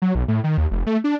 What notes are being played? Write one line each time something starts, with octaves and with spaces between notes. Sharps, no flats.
F#3
B1
A2
D#3
D#2
F1
A3
D4